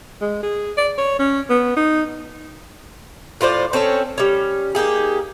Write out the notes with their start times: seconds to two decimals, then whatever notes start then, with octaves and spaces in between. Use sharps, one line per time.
0.21 G#3
0.43 G#4
0.77 D5
0.98 C#5
1.19 C#4
1.49 B3
1.76 D#4
3.41 A2 F4 C5 D5
3.73 C4 C#4 A4 C#5
4.18 G3 C#4
4.75 A#3 D#4 G4 G#4